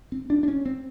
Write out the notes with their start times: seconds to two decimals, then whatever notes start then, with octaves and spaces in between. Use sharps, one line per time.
0.12 C4
0.30 D4
0.43 D4
0.48 C#4
0.66 C4